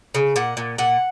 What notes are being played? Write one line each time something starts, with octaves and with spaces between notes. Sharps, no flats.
C#3
A#2 F#5
A#2
A#2 F#5